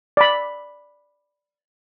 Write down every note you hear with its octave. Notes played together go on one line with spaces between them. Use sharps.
D5 B5